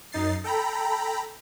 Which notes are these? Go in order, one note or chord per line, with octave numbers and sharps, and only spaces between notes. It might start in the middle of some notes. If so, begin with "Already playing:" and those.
F#2 D#4 A6 C7
A4 G5 A#5 B5